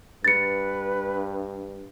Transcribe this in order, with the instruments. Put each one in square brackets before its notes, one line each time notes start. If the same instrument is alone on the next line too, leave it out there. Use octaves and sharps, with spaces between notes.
[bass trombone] G2 [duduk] B4 [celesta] A6 C#7